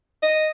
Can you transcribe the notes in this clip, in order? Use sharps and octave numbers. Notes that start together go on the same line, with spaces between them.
D#5